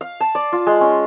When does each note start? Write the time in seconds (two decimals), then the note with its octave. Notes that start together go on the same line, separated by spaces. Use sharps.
0.01 F5
0.20 A5
0.35 D5
0.52 F4
0.67 G#3
0.81 C#4